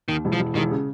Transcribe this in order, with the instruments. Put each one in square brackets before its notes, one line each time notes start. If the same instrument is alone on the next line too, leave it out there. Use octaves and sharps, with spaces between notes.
[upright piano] D#2 [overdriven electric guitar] D#3
[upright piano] E1
[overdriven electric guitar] F3
[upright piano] E1
[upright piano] E1 [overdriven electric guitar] D#3
[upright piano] C#3